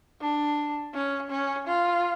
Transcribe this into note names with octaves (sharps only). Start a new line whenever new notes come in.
D4
C#4
C#4
F4